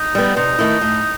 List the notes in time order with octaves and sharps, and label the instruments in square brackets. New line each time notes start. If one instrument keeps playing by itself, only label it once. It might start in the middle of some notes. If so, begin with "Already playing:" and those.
Already playing: [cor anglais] D#4
[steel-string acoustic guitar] G3 B3
[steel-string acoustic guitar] C3 [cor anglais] D#4
[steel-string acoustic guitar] D#3 A3 E4
A2